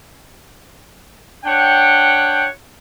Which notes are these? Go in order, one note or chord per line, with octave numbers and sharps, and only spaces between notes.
D4 C#5 F#5 G5